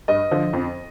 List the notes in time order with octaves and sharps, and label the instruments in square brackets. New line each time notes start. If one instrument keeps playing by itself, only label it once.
[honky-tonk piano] G2 [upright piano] D#5
[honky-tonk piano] D3 F3
F2